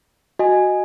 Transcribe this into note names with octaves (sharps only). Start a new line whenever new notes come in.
F#4 D#5 G#5